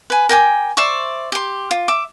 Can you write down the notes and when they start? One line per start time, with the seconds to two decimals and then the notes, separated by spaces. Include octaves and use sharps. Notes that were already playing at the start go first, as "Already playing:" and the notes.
0.10 B4 G#5
0.29 A#4 G5 G#5 D6
0.77 C5 D5 E5 C#6
1.32 G4 C6
1.71 F4
1.88 E5 D6